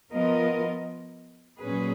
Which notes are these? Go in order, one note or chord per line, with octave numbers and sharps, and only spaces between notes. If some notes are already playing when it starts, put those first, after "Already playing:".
F3 B3 F4 A#4 D#5
A#2 F#3 C#4 G#4 B4